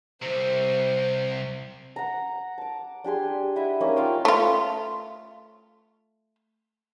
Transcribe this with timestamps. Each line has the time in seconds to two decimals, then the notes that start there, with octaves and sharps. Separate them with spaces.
0.22 C2 C3 C5
1.96 F#5 A#5
2.58 A5 D6
3.04 D4 G4 G#4 C6
3.56 E4 D#5 E5 F#5
3.81 A#3 C#4 D#4 D#5
3.96 F4 F5 G5
4.25 A3 F4